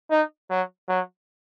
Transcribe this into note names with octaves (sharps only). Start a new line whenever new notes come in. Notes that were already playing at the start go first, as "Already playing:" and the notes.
D#4
F#3
F#3